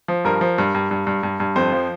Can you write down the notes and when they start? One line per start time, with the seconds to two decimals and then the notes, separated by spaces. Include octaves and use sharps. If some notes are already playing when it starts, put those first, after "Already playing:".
0.08 F3
0.25 G2 A#4
0.41 F3
0.58 G2
0.75 G2
0.91 G2
1.07 G2
1.23 G2
1.40 G2
1.56 F2 C5
1.72 F3